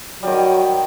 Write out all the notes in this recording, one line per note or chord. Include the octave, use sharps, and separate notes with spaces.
D#3 F#3 G3